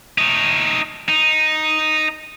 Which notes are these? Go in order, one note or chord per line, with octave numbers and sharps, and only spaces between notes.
A3 D#4
D#4